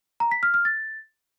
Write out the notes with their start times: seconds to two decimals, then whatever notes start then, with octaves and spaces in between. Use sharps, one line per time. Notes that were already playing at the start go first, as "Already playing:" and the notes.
0.20 A#5
0.31 B6
0.43 F6
0.54 F6
0.65 A6